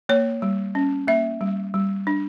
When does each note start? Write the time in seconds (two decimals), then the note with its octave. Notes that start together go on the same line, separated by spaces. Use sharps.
0.09 A#3 C#5
0.42 G3
0.75 C#4
1.07 A#3 E5
1.41 G3
1.74 G3
2.07 D4